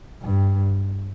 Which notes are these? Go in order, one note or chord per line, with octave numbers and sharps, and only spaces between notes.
G2